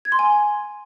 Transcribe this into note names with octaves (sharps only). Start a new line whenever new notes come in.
G#6
C6
G#5